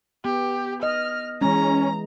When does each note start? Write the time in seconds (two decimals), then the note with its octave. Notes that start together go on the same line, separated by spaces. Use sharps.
0.25 B3 G4
0.83 D#5 F6
1.41 E3 G#3 C#4 A#5